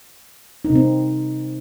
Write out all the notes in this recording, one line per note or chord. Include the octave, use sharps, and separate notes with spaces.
D#4
C3
C4